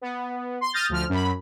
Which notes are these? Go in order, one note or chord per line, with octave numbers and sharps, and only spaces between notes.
B3
C6
D#6 F6 G6 A6 A#6
D2 F3 F6
F#2 B5